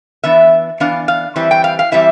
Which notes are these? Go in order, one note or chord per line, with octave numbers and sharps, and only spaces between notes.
E3 B3 D4 E5
E3 B3 D4 F5
F5
E3 G3 C4 E4
G5
F5
F5
E3 G3 C4 E4 E5